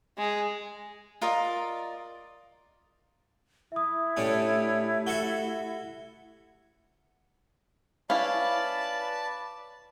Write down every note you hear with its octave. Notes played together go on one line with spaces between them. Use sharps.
G#3
F4 A#4 D5 D#5
E4 E5 D#6
A2 A3 C#4 D4 G4
F#4 A4 E5 G7
C#4 E4 B4 D5 F5 A5